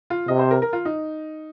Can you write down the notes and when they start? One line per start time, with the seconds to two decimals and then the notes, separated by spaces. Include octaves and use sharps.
0.10 F4
0.28 C3 D#5
0.39 C5
0.51 A#4
0.62 A#4
0.73 F4
0.85 D#4